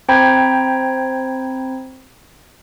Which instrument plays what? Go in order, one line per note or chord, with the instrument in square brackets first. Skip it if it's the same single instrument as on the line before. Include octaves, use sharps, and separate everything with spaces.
[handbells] C4 C5 G5 A#5 B5 G#6